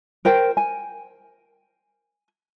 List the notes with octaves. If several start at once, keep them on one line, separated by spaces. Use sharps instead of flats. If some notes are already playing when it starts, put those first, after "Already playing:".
A#4 C5 G5
G#5